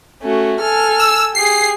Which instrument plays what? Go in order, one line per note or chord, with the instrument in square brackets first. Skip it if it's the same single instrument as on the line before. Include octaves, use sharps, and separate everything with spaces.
[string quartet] A3 C#4 F#4
A4 G#5 F6
[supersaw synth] E6
[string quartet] G4 G#4 [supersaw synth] C7